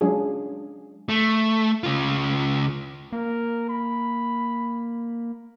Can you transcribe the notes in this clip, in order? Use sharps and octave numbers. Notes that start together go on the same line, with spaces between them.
F#3 G#3 C#4 D4 F4 G#4
A3
C#3 F4
A#3 A#4
B5